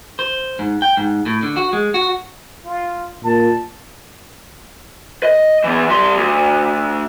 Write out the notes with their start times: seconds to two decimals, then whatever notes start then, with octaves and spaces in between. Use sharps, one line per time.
0.19 C5
0.59 G#2
0.82 G5
0.97 G#2
1.26 A2
1.43 D3
1.56 F#4
1.73 G#3
1.94 F#4
2.65 F4
3.24 A#2 A5
5.23 D#5
5.64 E3 B3
5.89 G3 C6
6.17 D2